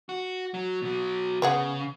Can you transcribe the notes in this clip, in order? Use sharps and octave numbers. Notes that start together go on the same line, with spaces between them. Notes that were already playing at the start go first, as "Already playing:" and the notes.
F#4
F#3
B2 F#3
C#3 B3 G#4 F#5